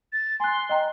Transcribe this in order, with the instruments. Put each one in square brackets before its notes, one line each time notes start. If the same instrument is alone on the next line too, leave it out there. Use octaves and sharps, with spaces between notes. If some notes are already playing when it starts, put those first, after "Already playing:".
[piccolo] A6
[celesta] G#5 F#6 [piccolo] C6
[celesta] D#5 G5 A#5